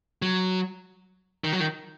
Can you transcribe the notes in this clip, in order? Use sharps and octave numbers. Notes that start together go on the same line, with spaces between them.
F#3
D#3
F#3
D#3